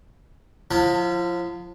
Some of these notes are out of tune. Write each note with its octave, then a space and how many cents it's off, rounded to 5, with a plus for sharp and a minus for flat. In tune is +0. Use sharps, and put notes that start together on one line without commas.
F3 +30 F4 -40 A5 +35